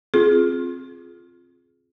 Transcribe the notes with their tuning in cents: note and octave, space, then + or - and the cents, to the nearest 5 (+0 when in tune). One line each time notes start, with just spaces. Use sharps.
C4 +10 F4 +0 G#4 +20